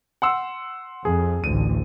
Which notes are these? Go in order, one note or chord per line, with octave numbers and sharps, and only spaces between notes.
F#5 C6 E6
F2 G#4
A1 D2 D#7